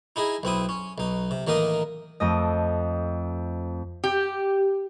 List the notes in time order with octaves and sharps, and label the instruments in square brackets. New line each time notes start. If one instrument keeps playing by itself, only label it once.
[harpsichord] D#4 E4 G#4 D#5
B1 C4 E4 D#6
C#4
B1 D#4
C3
A1 D#3 A#3 D#4 A#4 D#6
[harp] F2 A3 D#5
[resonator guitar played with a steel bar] G4